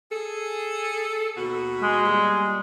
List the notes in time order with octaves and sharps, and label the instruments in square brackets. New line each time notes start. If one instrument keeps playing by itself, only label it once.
[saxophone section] G#4 A4
D#2 B2 F#4
[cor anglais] G#3
[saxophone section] A#2 G3